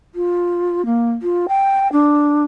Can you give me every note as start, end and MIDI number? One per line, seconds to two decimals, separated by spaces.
0.14 0.84 65
0.85 1.11 58
1.22 1.45 65
1.48 1.90 79
1.92 2.44 62